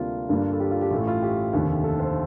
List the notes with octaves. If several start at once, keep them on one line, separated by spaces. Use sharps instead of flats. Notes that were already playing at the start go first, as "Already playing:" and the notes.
Already playing: D2 C3 G3 A#3 D4 F4
G2 D3 G3 A#3 D4
A4
G4
F4
G4
A1 A2 A3 F4
F4
G4
F1 D#2 D3
A4
C5